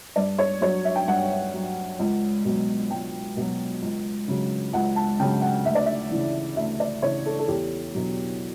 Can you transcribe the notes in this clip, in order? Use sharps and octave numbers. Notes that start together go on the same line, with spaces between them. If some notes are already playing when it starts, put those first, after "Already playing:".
G2 D5
C#5
F#3 C#5
E5
G5
G2 F#5
F#3
C#2
B2 F#3
C#2 G5
B2 F#3
C#2
C#3 F#3
C#2 F#5
A5
C#3 F#3 G5
F#5
D2 E5
D5
E5
C#3 E3
D2 E5
D5
C#3 E3 C#5
A4
A4
E2 G4
B2 F#3